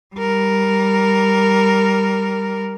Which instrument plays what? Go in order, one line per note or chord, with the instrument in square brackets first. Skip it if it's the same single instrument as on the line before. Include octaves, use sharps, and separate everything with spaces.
[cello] G3 A#4